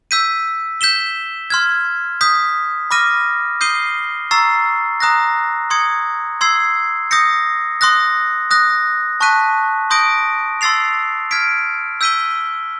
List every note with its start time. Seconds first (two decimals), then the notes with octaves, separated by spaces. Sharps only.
0.11 E6 G6 B6 D#7
0.81 G6 B6 E7 G7
1.50 C6 F6 G#6
2.21 D#6 G6 B6
2.91 B5 D6 F6 A#6 D#7
3.61 D#6 G6 C7 D#7 G7
4.31 A#5 C#6 E6 A6 C7
5.00 A#5 D#6 F#6 A#6
5.70 C6 D#6 G#6 C#7
6.41 C6 E6 G#6 C7
7.11 D#6 G6 A#6 C#7
7.81 C6 D#6 F#6 A#6
8.51 D#6 F#6 A#6
9.20 A5 C#6 F#6 B6 D#7
9.90 C6 D#6 G6 A#6 D7
10.61 C6 E6 A6 C7 F7
11.31 F6 G#6 B6 D7
12.01 E6 G6 B6 D#7 G7